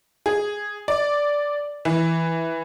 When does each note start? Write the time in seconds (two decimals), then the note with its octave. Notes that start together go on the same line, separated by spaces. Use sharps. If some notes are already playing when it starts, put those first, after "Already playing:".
0.26 G#4
0.88 D5
1.85 E3